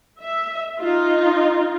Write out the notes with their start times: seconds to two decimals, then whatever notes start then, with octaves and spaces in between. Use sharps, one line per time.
0.21 E5
0.80 D#4 F4